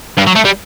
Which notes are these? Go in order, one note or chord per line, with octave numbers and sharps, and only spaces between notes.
G2
F#3
A3
G3